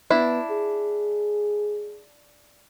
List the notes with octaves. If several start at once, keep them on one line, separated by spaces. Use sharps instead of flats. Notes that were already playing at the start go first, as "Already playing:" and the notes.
B3 D4 E4
G#4